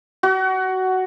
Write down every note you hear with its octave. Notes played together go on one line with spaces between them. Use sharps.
F#4